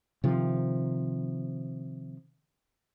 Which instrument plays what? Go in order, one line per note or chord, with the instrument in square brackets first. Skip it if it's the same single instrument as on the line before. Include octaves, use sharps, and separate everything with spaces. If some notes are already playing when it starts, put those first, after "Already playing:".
[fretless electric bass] C3 D#3 F3